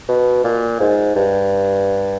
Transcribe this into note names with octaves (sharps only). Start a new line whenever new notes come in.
B2
A#2
G#2
G2